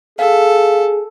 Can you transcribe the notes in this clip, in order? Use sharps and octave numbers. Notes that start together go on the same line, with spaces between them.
G#4 A4 F5